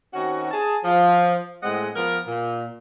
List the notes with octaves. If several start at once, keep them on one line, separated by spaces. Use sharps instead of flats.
D#3 C4 C#4 F#4
G#4 A5
F3
A2 G#3 C4 D#5 F#5
F3 B3 A#4
A#2